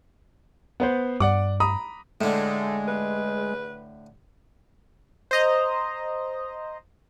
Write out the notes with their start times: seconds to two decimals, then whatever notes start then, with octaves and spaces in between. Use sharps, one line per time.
0.80 B3 B4 C5
1.20 G2 D5 F#5 D6
1.60 A#5 B5 D#6
2.21 A2 D3 G#3 A3
2.88 B4
5.31 C5 D#5 A#5